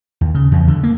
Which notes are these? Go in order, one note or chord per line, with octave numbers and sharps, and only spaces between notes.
D#2
C#3
E2
D3
A#3